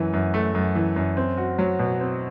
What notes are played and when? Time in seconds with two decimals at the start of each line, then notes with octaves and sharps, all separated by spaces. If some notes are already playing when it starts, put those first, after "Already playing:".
Already playing: F#2 E3
0.13 F#2
0.34 A3
0.55 F#2
0.75 E3
0.96 F#2
1.17 C4
1.38 F#4
1.59 F#3
1.79 B2
2.00 C4